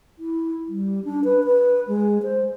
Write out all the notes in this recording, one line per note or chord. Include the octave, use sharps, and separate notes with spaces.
E4
G3
D4
B4
B4
G#3
C5